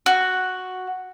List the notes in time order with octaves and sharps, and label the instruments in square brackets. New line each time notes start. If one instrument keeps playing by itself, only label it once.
[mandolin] F#4